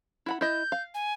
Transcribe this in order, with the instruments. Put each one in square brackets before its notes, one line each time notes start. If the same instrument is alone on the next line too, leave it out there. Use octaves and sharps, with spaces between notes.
[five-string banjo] E4 F#5 B5
[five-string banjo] E4 D#5 [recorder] G6
[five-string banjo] F5
[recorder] G#5